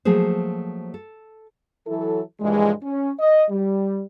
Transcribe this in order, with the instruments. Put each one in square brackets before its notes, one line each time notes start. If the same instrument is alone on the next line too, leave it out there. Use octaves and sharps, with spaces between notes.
[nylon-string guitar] F3 F#3 A3 A#3 G#4 C5
A4
[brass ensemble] E3 F#3 E4 A4
G2 A#2 E3 F3 G#3
C#4
D#5
G3